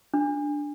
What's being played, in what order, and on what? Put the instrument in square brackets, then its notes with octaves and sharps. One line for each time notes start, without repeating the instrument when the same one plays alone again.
[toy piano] D4